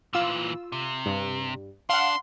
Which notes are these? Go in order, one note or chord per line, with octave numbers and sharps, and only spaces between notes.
A#2 E3 F4 E6
C3
G2
D4 F5 F#5 C6